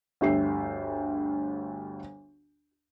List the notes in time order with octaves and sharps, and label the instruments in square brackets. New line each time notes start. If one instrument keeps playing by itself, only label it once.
[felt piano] G1 D2 G4 E5 C7